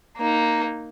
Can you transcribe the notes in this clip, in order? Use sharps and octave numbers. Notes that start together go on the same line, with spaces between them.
A#3 D#4